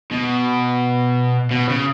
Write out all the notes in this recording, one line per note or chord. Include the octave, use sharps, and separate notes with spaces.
B2
B2
C#3